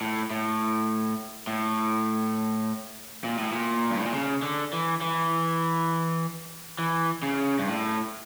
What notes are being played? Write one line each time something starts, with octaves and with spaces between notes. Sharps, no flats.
A2
A2
A2
A#2
A2
A#2
G2
A2
A#2
C#3
D3
E3
E3
E3
C#3
G2
A2